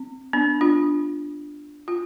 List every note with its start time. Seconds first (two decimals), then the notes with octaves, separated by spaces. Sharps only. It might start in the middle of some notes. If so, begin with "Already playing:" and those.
Already playing: C4
0.33 B3 D4
0.61 D4 F4
1.88 F4